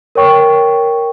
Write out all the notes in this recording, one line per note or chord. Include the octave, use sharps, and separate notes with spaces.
A#4 C#5 G5 C#6